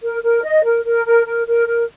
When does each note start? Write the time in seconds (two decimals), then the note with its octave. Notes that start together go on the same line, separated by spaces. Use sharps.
0.03 A#4
0.23 A#4
0.44 D#5
0.64 A#4
0.85 A#4
1.05 A#4
1.26 A#4
1.47 A#4
1.67 A#4